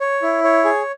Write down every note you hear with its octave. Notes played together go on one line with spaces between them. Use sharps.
C#5
E4
C#5
G#4